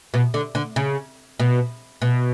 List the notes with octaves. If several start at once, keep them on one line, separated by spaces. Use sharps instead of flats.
B2
D3
D3
C#3
B2
B2